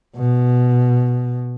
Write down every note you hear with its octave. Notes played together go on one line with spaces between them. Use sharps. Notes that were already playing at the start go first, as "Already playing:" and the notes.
B2